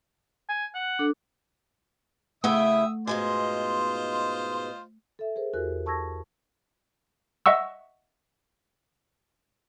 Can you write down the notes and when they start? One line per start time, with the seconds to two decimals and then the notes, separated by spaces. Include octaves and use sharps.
0.49 G#5
0.75 F#5
0.99 D4 A4
2.44 C#3 A3 E4 E5 F#5 G5 D#6 E6
3.07 G#2 B2 F4 C5 D#5 G#5
5.19 A4 E5
5.36 G#4 A#4 C5
5.54 E2 E4 F#4 G4 A#4 F#6
5.86 A5 C#6 E6 G#6 A#6
7.46 D#5 E5 F#5 C#6 E6